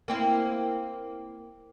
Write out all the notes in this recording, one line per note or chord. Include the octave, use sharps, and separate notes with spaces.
A#3 C4 E4